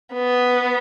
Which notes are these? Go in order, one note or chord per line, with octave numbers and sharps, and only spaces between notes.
B3